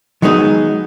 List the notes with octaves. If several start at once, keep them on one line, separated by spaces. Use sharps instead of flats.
D#3 F#3 G#3 B3 D#4 F#4